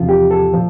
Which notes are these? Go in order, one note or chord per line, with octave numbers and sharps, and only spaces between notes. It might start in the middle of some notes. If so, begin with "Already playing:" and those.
Already playing: E2 C3 F3 F4
G4
A4
A#2 F3